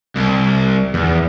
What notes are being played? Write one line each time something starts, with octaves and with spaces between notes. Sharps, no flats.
C2
E2